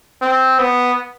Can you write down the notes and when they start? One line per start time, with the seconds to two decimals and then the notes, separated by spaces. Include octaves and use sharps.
0.22 C4
0.59 B3